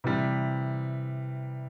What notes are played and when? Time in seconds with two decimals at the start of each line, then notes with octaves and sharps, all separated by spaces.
0.04 C3 E3 G3